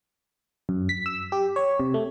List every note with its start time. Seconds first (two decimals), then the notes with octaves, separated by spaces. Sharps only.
0.69 F#2
0.89 B6
1.06 E6
1.32 G4
1.56 C#5
1.80 C3
1.94 A3